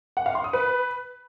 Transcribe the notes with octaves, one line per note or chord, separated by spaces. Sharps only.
F#5
F5
C6
D#6
B4